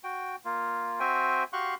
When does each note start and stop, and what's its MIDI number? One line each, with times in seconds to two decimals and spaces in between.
0.04 0.36 66
0.04 0.36 79
0.45 1.00 58
0.45 1.00 65
1.00 1.44 60
1.00 1.44 66
1.00 1.44 72
1.00 1.44 76
1.00 1.44 79
1.00 1.44 80
1.53 1.75 66
1.53 1.75 67
1.53 1.75 77
1.53 1.75 84
1.53 1.75 85
1.53 1.75 90